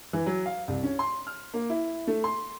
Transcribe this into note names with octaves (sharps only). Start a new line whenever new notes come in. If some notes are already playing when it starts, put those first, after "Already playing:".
E3
F#3
F5
C2
C#4
C6
F6
A#3
E4
A3
C6